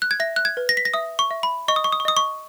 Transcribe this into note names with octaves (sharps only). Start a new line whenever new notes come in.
F#6
G#6
E5 A#6
F#6
G#6
B4
A#6
B6
A#6
E5 D#6
C#6
E5
B5
D#5 C#6
D#6
C#6
D#6
C#6
D#5 D#6
C#6